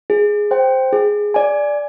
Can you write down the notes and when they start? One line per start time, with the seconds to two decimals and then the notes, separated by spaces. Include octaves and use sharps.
0.10 G#4
0.51 C5 G5
0.93 G#4
1.34 D5 G#5